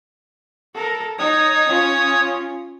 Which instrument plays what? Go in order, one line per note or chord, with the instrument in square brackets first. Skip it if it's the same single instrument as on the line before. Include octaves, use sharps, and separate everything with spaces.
[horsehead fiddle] A4 A#4
[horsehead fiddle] D#4 [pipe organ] C#5 D#6
[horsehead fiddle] C#4 F4